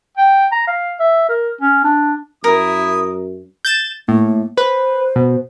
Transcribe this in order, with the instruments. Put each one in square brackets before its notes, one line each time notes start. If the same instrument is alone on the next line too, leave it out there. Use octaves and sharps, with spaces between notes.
[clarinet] G5
A#5
F5
E5
A#4
C#4
D4
[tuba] F#2 [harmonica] E4 D#6 [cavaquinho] A#4
[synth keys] G6 A6 E7
[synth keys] A2 [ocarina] A#3
[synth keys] B4 [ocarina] C5
[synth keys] B2